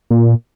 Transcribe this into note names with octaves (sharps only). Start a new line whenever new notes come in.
A#2